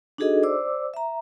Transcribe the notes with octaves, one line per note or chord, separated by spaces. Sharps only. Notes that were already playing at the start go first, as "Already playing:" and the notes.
D4 D#4 F#4 G#4 A4 D#5
C5 D5 D6 E6
E5 A#5